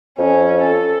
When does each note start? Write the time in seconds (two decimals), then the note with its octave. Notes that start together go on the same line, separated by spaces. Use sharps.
0.18 F2 C#4
0.62 A4